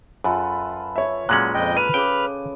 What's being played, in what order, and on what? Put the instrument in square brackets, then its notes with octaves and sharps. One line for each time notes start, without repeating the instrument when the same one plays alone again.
[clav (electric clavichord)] F#2 [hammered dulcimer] F4 A4 B4
[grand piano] C#5 E5
[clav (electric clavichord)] A#2 G#3 C#4 [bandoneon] F#3 [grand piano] F#6 F#7
[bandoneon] F2 D#5 G5
[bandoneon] B4 F6 [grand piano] D#7
[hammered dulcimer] C#3 D6 [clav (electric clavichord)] G5